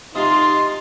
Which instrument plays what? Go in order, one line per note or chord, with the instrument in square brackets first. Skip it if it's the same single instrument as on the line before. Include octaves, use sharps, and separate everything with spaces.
[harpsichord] C3 G#3 [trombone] D#4 [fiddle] F4 [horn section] D#5 A#5 C6